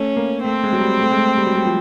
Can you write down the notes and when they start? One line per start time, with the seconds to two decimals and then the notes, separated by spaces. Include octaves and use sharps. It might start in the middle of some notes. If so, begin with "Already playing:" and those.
Already playing: A3 C#4
0.17 A#3
0.44 A3 C4
0.64 G#3
0.73 F#3
0.81 G3
1.00 A3
1.11 G#3
1.19 A3
1.37 G3
1.47 F#3
1.55 G3
1.65 F3